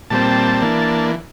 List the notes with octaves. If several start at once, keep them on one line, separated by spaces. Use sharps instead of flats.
A#2 G3 C4 A5
E3 A#3 D4